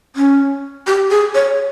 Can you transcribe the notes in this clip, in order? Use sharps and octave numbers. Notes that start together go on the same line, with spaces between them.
C#4
G4
G#4
C#5